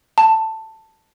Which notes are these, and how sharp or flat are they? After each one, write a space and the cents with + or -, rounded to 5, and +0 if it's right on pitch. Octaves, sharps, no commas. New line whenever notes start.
A5 +10